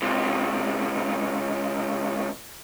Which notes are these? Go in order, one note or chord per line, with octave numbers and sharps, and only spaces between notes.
C#2 C3